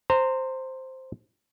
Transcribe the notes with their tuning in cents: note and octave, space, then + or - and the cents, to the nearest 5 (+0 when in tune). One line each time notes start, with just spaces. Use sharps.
C5 +0 A#5 -25